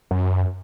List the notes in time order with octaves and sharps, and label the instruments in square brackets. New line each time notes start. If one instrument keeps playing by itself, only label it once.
[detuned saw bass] F#2